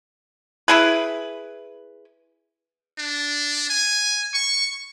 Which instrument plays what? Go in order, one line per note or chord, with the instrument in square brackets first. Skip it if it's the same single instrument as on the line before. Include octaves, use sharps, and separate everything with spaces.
[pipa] E4 G#4 B4
[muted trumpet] D4
G#5
C#6